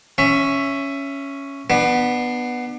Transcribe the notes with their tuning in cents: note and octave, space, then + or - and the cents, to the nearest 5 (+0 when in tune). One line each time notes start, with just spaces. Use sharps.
C#4 +0 E5 +15
B3 -5 D4 +30